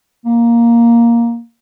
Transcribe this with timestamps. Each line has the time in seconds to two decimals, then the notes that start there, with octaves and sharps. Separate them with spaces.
0.26 A#3